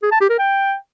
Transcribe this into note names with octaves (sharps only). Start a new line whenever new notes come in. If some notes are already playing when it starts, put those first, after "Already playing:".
G#4
A5
G4
A#4
G5